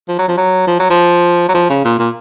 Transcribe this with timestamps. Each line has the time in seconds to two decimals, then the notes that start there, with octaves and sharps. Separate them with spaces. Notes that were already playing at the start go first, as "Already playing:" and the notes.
0.08 F3
0.18 F#3
0.28 F3
0.37 F#3
0.67 F3
0.79 F#3
0.90 F3
1.49 F#3
1.54 F3
1.69 C#3
1.85 A#2
1.99 A#2